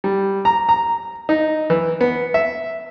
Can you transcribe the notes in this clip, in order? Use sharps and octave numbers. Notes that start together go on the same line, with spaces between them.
G3
A#5
A#5
D#4
E3
B3
E5